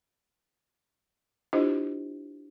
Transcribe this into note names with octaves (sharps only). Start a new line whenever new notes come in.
D4 E4 F4 G4 C5 D#5